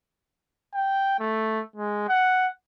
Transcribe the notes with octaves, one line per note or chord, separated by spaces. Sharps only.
G5
A3
G#3
F#5